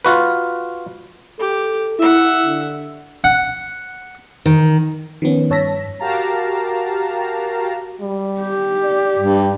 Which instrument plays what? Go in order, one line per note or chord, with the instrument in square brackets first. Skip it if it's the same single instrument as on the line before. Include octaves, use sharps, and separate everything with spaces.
[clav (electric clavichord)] F4 F#4 B4
[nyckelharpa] G4 [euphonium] A4
[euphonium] E4 [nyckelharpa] E5 F#5
[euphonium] D3
[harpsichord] F#5
[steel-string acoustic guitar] D#3
[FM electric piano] D#3 F3 B3 C#4
G2 C#5 A5 E6 A#6 B6
[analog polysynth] F#4 G4 A#4 F5 A5 A#5
[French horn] G3
[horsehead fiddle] G4
[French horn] D5
[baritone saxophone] G2